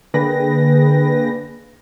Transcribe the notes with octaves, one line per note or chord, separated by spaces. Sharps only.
D3 A#3 G#4 B4 G5 A#6